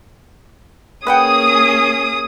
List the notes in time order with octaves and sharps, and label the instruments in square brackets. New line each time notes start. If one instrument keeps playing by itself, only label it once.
[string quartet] A#3 C#4 G#4 [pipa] B4 F#5 G5 [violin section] D#6